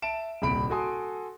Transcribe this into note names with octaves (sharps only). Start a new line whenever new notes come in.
E5 A5 D7 E7
D#1 C2 B5 D7
F#4 A4 G#5 C6 D#6